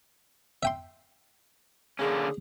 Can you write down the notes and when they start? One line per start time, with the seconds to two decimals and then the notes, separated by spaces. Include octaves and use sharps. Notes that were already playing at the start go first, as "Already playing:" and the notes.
0.63 E5 G5 C6
1.99 D3 A#3 C#4 G#4